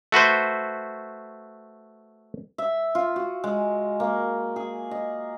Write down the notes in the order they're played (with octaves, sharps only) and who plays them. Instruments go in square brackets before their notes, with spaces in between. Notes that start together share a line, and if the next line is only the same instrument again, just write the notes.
[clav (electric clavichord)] A3 F#4 B4 C5
[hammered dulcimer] E5
F4
F#4
G#3
A#3
G#4
D#5